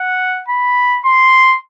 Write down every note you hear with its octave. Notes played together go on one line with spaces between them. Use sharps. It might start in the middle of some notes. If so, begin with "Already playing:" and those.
Already playing: F#5
B5
C6